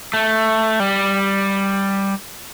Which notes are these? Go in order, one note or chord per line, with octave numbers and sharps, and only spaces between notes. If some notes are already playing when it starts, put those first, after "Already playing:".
A3
G3